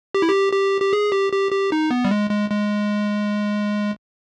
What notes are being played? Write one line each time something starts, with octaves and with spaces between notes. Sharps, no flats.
G4
E4
G4
G4
G4
G#4
G4
G4
G4
D#4
B3
G3
G#3
G#3
G#3